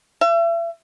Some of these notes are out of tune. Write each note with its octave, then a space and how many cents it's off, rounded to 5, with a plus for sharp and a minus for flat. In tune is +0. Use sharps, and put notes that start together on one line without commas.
E5 +35